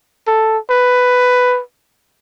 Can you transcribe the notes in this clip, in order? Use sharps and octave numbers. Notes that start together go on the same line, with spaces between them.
A4
B4